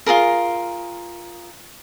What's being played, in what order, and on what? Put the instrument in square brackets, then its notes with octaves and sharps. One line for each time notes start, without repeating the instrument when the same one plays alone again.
[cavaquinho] F4 F#4 G#4 A#4